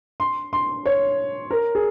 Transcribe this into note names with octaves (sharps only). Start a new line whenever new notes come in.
C6
C6
C#5
A#4
G#4